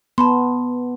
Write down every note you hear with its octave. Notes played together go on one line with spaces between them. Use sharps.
B3 A5 B5 C6